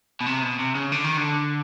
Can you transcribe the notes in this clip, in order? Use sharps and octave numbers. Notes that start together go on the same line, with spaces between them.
B2
C3
B2
C3
C#3
D3
D#3
D3